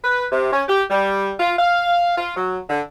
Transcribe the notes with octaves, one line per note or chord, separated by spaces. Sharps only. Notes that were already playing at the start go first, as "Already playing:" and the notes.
B4
C3
C#4
G4
G3
F4
F5
F4
F#3
D3